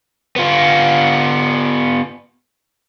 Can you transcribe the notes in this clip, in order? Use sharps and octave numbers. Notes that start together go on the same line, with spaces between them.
B3 F4